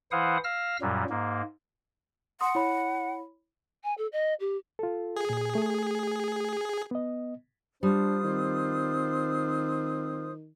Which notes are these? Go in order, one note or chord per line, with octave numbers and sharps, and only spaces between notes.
E3 E4 C5 F5 F#5 D#6
F5 E6 F6 A#6
F#2 A#2 F#3 G3
G#2 A#3
F#5 C6 D#6
E4 C#5 B5
G#5
A4
D#5
G4
F4 A4
G#4
A#2
A3
B3 D#5
G3 D4 F4 C5 D#6
D#3 C4